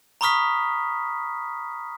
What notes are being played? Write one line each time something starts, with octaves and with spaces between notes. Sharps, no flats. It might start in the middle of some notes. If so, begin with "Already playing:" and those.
A#5 B5 C#6 D#6 F6 B6